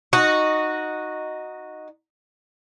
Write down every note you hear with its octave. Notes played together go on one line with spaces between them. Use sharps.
D#4 F#4